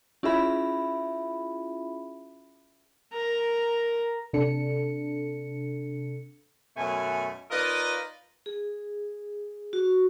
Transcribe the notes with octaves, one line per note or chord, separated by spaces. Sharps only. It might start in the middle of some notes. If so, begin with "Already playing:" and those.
C#4 E4 F4 G#4 E5 B5
A#4 A#5
C3 D4 A4 C#7
F#2 B2 A3 G#5
D#4 F4 A#4 B4 D5 D#5
G#4
F#4